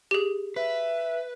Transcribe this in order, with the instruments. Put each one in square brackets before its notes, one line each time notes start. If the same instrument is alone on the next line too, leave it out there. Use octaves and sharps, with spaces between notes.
[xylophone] G4 G#4
[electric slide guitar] B4 [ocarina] E5